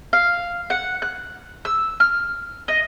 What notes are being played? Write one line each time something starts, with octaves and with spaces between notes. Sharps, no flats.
F5
F#5
F#6
E6
F6
D#5